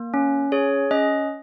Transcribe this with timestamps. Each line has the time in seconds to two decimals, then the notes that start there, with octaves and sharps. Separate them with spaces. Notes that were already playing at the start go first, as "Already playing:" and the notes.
Already playing: A#3
0.14 C#4
0.52 G#4 C#5
0.91 C#4 D#5